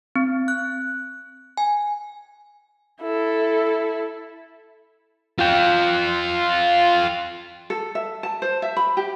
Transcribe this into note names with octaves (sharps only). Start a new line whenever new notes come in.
C4
F#6
G#5
E4 A4
F4 G5
A4
E5
A5
C5
E5
B5
G4